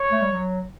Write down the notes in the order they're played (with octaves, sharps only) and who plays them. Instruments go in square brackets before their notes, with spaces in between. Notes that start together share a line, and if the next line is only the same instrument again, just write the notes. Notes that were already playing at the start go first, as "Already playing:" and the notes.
Already playing: [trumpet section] C#5
[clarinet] A3
G3
F#3